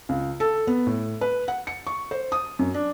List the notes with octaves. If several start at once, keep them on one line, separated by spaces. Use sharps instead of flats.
C#2
A4
B3
A2
B4
F#5
C#7
C#6
C5
D#6
F#2
D4